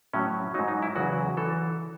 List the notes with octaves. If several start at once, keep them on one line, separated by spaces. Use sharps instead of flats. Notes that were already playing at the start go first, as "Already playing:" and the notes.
A2 F#3 C#4
G#2 F#3 D#4
D#4
E4
E2 C#3 F#3 F#4
E3 A4